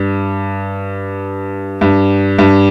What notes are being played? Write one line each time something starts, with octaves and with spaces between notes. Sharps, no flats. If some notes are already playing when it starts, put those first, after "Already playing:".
Already playing: G2
G2
G2